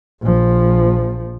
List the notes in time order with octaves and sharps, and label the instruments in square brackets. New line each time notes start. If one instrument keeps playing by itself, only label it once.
[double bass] A#1 F3